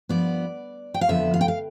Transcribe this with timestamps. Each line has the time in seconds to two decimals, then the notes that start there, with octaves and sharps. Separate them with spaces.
0.09 G2 F3 B3 D5
0.94 G5
1.01 F5
1.09 F2 D3 F3 B3 E5
1.34 F5
1.41 G5
1.48 F5